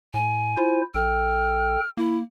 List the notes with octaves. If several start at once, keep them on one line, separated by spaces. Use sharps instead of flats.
A2 G#5
E4 F4 C5
A#1 A4 G5 F6
A#3 E4